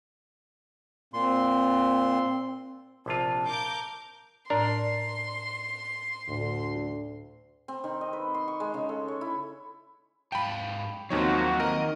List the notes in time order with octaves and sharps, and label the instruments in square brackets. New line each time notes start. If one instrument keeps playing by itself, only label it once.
[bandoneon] A#2 C6 [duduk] C4
[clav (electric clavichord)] A#1 C3 F4 [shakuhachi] A5
[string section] A#4 D6 G6 [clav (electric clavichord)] F5
[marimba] A2 D5 [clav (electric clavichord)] D4 A#4 [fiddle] C6
[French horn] D2 [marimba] A2
[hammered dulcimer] C4
D#3
D#5
B4
C6
C#6
G#3
C#3
A4
C#5
E4
[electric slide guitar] G#2 F5 A5 [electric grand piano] G5 B5
[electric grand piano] D#2 D#4 C#5 [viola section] F3 A#3 C4 [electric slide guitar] F#3 [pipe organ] F#4
[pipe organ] D#3 [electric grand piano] A#4 [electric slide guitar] D#5